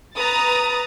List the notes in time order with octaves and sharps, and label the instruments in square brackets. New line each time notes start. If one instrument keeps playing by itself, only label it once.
[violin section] B4 A#5 D#6 A6